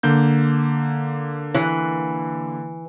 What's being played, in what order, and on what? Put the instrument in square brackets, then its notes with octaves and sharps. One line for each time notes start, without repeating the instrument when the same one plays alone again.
[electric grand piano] D3 A#3 G6
[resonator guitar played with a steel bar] E3